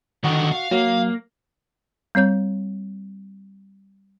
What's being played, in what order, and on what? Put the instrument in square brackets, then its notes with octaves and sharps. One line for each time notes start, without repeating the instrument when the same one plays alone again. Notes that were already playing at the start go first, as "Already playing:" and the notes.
[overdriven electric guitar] D3 D#3 [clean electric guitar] F#4
[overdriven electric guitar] F5
[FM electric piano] F#3 [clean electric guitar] A#3
[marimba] G3 C4 C#5 G6